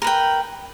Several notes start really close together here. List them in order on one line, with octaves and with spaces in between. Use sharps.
A#4 B4 G5